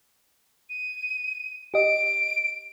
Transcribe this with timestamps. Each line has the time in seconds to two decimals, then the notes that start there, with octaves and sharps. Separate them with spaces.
0.69 D#7
1.74 G4 D#5 D7